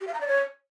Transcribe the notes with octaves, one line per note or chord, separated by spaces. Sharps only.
G4
F5
A#5
D5
C#5